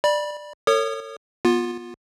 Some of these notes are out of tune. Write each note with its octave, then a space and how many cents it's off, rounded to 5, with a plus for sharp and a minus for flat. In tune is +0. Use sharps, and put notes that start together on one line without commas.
D5 +15 B5 -25
A4 +45 C#5 +0 D#6 -30
B3 -25 F4 +15